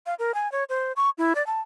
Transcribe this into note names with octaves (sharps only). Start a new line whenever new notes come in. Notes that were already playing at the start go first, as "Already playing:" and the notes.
F5
A#4
G#5
C#5
C5
C#6
E4
D5
A5